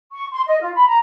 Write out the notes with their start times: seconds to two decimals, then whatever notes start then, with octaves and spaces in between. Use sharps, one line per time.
0.13 C#6
0.32 C6
0.47 D#5
0.61 F4
0.74 B5
0.87 A#5